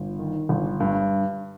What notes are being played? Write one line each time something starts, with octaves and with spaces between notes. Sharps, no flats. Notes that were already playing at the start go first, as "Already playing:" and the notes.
Already playing: G1
D#3
G1
G2